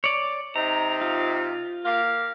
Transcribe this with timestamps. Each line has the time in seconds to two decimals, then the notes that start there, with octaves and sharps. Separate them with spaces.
0.04 C#5 D5
0.56 C3 D#4 A#5
1.01 F4
1.85 A#3 G4 F5